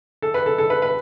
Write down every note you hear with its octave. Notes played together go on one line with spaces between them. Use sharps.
A4
B4
A4
A4
B4
B4